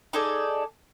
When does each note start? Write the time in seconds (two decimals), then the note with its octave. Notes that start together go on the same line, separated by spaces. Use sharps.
0.13 D#4 G#4 A4 D5